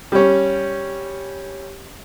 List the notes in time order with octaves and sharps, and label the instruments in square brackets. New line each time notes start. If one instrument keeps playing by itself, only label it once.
[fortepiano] G3 C#4